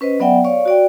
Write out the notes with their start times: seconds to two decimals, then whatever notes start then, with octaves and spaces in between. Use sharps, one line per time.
0.01 C#4 B4 C5 D#5
0.20 F#3 B3 D5 E5 F#5 G5
0.44 C#5 D5 F5 C#6
0.66 F#4 D5 G5